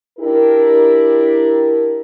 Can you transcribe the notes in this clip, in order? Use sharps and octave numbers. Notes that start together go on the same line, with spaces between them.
D4 E4 G4 A#4